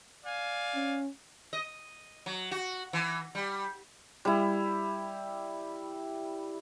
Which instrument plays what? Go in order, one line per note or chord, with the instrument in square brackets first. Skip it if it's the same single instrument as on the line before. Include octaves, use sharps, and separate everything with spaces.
[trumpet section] D5 F5 G#5
[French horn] C#4
[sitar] D#5
F#3
F#4
E3
G3
[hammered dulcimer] G3 E4